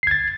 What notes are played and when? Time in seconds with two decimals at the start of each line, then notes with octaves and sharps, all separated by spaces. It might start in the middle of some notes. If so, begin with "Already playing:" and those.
0.03 C7
0.07 G#6
0.11 A6